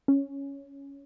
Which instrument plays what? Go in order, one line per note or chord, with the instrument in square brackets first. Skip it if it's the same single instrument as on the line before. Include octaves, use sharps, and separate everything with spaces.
[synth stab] C#4